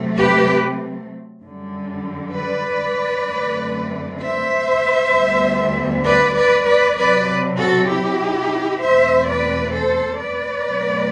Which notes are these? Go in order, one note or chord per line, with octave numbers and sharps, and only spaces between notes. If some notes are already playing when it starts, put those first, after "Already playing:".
Already playing: C3 F#3 A3 C4
G4 B4
F#2 D3 G3
B4 D5
F#2 D3 A3 C4
C5 E5
D2 D3 G3 B3
B4 D5
B4 D5
B4 D5
C3 F#3 C4 B4 D5
F#4 A4
E4 G4
E2 B2 A3 C4 C5 E5
B4 D5
A4 C5
B4 D5
B2 F#3 A3 C4